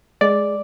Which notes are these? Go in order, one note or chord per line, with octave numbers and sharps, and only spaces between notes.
G#3 D5